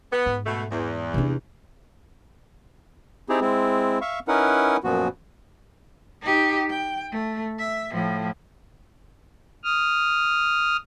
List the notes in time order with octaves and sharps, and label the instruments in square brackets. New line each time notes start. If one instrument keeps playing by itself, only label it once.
[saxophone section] B3
[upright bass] G#2
[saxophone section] B2 A3
E2
[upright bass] C3 D4
[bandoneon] C4 D#4 E4 G4 G#4
G#3 C4 E4
E5 F5 C#6
C#4 D#4 E4 A#4 B4 F#5
F#2 A#2 F3 B3 F#4
[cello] D#4 G4
G5
A3
E5
A2 F3
[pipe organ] D#6 F6